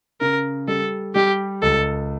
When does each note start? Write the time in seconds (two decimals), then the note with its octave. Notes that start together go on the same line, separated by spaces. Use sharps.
0.21 C#3 A#4
0.68 G3 A4
1.15 G3 G4
1.62 C#2 A4